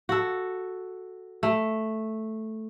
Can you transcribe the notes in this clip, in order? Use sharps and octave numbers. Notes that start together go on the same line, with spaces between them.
F#4 A4
A3